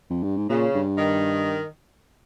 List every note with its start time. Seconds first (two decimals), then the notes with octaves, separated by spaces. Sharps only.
0.10 F2
0.23 G2
0.37 G#2
0.50 A#2 C#3
0.75 G2
0.98 D#3